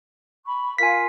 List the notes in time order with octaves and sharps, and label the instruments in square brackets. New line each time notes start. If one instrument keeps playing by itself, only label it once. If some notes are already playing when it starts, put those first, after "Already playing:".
[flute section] B5 C#6
[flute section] F4 A#4 F5 [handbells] G#5 B6